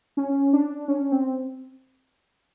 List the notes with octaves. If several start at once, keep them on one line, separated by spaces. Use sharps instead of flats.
C#4
D4
C#4
C4